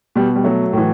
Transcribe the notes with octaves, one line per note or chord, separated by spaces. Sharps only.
B2 G3
G3
F#3 A3
A2 E3